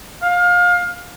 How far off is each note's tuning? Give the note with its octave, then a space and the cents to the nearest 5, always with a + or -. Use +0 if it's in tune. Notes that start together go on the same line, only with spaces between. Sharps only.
F5 +25